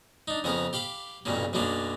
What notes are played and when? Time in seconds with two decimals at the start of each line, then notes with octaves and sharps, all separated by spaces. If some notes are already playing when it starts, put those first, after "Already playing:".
0.28 D4 D#4
0.44 F2 C#3 B3 A#4
0.73 G4 F5 B5 D6
1.25 B1 G2 A#2 C#3 A#3
1.53 B1 F#2 F#3 A#3 B3 D4